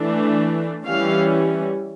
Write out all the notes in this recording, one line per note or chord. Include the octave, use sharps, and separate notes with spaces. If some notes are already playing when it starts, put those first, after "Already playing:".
Already playing: E3 A3 D4
E3 G3 C#4 F5